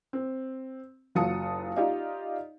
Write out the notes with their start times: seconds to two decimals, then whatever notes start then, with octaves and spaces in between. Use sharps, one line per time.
0.13 C4
1.15 F#1 F#3 F4 A5 D#6 C#7
1.76 D#4 F4 G4 D5 D#5 F5